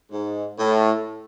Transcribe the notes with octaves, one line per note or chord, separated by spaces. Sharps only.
G#2
A2